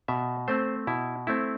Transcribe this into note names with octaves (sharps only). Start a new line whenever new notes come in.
B2 E5
A3 C4 C5
B2 E4
A3 C4 E4